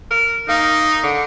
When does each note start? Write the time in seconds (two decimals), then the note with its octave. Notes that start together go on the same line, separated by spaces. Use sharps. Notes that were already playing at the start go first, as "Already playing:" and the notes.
0.11 A#4
0.49 A#3 D#4
1.03 D3